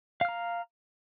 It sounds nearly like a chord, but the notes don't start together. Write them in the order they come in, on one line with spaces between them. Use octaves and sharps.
F5 F6 A#5